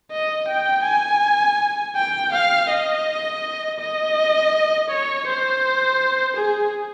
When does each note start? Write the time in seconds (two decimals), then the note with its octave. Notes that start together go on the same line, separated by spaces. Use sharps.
0.12 D#5
0.48 G5
0.84 G#5
1.96 G5
2.33 F5
2.69 D#5
3.79 D#5
4.90 C#5
5.27 C5
6.37 G#4